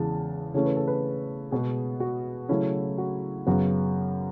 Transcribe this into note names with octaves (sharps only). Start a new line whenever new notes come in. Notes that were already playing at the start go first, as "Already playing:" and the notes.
Already playing: E2 C#3 E3 G#3 A5
C#3 E3 A3 C#4 C#5
B4
A4
B4
B2 G#3 B3 G#4
F#4
C#3 F#3 A3 C#4 E4
F#4
F#2 C#3 F#3 B3 F#4